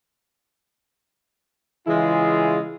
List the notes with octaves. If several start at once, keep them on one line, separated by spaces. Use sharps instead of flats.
C#3 E3 G#3 E4 F4 G#4